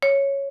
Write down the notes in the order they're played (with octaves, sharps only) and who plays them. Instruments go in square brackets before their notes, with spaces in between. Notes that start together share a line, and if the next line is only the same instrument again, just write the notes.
[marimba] C#5